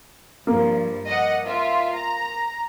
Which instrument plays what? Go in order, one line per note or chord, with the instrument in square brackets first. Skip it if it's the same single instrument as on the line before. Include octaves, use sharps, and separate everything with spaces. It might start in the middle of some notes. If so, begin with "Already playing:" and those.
[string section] G2 F3 [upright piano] A#3
[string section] D#5 F#5
F4 E5
A#5